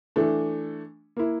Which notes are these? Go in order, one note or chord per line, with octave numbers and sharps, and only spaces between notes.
E3 A3 D4
A#3 E4